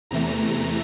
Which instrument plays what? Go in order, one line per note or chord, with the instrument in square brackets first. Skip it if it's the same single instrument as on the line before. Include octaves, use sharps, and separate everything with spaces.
[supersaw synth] E2 C3 E3 A3 A#5